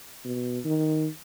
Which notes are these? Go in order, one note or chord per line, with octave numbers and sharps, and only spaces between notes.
B2
D#3